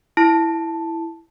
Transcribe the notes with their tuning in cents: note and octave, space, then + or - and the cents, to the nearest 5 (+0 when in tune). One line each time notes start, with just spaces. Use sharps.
E4 +0 A5 +0